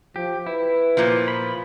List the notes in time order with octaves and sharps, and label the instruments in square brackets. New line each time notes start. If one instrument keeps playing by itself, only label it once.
[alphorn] F3 [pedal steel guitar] G4
[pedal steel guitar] E4 [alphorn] B4
[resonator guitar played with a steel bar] A#2 F3
[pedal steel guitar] B5